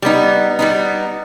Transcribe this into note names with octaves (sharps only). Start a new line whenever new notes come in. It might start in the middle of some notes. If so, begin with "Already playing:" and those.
G3 B3 D#4
G3 B3 D#4